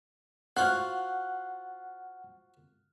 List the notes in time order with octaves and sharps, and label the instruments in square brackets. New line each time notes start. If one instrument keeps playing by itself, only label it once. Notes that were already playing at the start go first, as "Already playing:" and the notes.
[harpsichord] F4 F#4 C5 [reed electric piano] F#5 [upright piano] F6 F#6